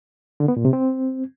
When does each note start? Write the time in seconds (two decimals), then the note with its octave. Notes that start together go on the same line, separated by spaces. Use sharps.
0.40 D3
0.48 B3
0.57 A#2
0.65 C3
0.73 C4